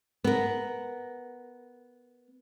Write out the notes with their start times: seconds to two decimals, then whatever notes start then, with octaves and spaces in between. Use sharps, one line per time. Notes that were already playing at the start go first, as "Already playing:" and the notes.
0.24 B3 A#4